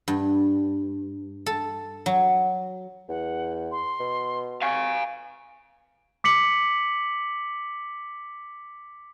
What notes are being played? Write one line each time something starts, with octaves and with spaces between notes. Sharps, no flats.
G2
A4
F#3
E2 F#5
C6
B2
F5 G#5 C#6
D6 B6 C#7 F#7